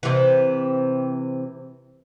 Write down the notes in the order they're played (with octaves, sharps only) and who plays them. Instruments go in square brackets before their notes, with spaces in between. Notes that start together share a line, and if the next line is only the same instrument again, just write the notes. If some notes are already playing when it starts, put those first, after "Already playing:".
[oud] C3 E3